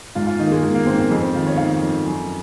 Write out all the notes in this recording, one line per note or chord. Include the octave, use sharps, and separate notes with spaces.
G#2 F4
F4
D#3 D#4
A#3
G#3
D#3 G#3
A#3
G#2 C4
A#3
F2 G#3
C4
D#3 F4
C#5
D#3 F5
F2
F#2